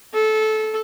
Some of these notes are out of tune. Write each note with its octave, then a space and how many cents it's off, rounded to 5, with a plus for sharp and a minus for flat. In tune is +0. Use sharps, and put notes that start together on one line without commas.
A4 -20